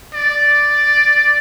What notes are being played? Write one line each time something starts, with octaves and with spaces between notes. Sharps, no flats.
D5